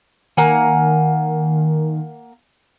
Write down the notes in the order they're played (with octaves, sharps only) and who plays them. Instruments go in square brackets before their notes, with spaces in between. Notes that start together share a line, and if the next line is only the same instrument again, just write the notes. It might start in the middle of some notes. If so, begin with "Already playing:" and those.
[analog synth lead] D#3 [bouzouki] A#3 F#5 G#5